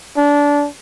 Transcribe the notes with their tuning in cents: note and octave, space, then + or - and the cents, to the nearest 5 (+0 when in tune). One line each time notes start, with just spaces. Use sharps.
D4 -20